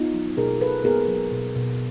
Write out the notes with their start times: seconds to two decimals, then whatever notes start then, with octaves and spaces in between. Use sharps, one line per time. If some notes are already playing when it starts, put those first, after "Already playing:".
Already playing: B3 D#4 F4
0.14 F#3
0.37 B2 G#4 A#4
0.61 B2 A4 B4
0.84 B3 G#4 A#4
1.08 F#3
1.32 B2
1.56 B2